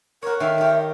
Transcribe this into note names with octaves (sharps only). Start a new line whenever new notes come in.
F#4 A#4 C#5
D#3 A4 E5 F5
G4 A#4